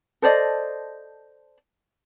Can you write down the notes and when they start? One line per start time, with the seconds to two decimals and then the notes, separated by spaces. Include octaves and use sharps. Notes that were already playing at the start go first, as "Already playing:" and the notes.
0.22 A4 C5 D5 D#5